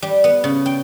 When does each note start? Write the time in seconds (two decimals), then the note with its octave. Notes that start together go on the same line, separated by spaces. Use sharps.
0.02 G3
0.24 B3
0.44 C#3
0.66 G5